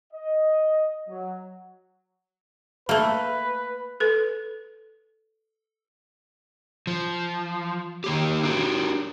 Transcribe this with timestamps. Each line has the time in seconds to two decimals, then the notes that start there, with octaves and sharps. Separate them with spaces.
0.13 D#5
1.09 F#3
2.89 A3 A#3 B4
4.00 A4 B4
6.87 F3
8.04 D#3 A#3 G4
8.43 D4 F#4 G4